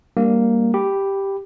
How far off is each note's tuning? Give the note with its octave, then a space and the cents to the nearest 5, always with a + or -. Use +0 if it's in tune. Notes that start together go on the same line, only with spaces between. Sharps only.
G3 +15 A#3 +0 D4 +0
G4 +0 B5 +0